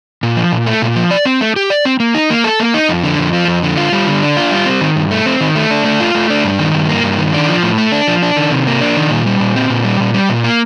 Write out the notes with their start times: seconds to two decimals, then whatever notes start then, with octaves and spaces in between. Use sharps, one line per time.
0.23 A#2
0.37 F3
0.52 A#2
0.66 A3
0.82 A#2
0.96 F3
1.11 D5
1.25 C4
1.41 A3
1.56 G4
1.70 D5
1.85 C4
2.00 A#3
2.15 D#4
2.30 A#3
2.44 A4
2.60 A#3
2.74 D#4
2.89 F2
3.04 D3
3.19 F2
3.33 F3
3.48 F2
3.63 D3
3.77 F4
3.92 G3
4.07 D3
4.23 D4
4.37 F4
4.51 G3
4.66 C4
4.81 D#3
4.96 G2
5.11 A3
5.26 C4
5.40 D#3
5.55 A3
5.71 D4
5.84 A3
6.00 F4
6.15 A3
6.30 D4
6.44 G2
6.59 D#3
6.74 G2
6.89 A#3
7.03 G2
7.19 D#3
7.34 D4
7.48 F3
7.63 A2
7.78 A3
7.92 D4
8.07 F3
8.22 D4
8.36 D#3
8.51 C3
8.67 A#3
8.81 D4
8.97 D#3
9.10 A#2
9.26 G3
9.40 A#2
9.56 C4
9.70 A#2
9.85 G3
10.00 A#2
10.14 G3
10.29 A#2
10.44 A#3